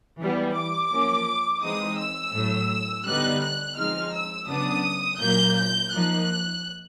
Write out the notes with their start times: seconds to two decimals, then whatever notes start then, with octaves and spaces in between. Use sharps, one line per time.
0.21 E3 G3 B3
0.55 D6
0.92 F3 A#3 C#4
1.63 E3 G#3 C4 D#4 D#6
1.98 E6
2.34 A2 F#3 A3
3.06 D3 G3 B3 D#4 F#6
3.41 F#6
3.77 F3 G#3 C4 D#4 F6
4.13 E6
4.48 C#3 F#3 B3 D4 D#6
5.20 A#2 F#3 A#3 G6
5.56 G6
5.92 F3 A#3 D#4 F#6